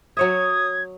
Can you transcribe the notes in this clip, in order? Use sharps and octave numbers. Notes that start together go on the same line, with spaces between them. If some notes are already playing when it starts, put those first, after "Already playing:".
F#3 C#5 E5 D#6 G#6